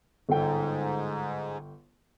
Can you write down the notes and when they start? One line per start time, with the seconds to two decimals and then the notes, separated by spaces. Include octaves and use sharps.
0.29 G1 G#2 A4 G5